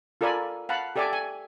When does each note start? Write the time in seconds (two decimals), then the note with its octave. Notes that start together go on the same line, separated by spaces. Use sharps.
0.21 F4 A4 A#4 D5 G#5 B5
0.69 F5 F#5 A5 B5
0.96 G4 A4 D5 E5 G#5 D6
1.13 G#5